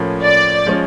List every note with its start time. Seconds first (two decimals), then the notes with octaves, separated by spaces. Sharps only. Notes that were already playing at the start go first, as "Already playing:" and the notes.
Already playing: A2 F3 A#3 C#4
0.23 D5
0.66 F3 G#3 C#4